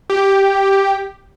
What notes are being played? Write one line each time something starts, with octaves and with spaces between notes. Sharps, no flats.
G4